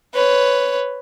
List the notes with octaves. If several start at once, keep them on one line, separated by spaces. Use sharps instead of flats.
B4 C#5